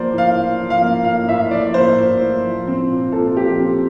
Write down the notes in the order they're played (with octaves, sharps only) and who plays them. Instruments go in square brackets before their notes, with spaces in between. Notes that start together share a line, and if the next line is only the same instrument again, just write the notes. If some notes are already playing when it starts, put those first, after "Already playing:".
Already playing: [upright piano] F3 A#3 C5 D5
A2 F5
A2
F3
F5
A#3
A2 F5
A2 E5
F3 D5
A#3 C5
A2
A2
F3
C4
A#2
A#2 A4
F3 G4
C4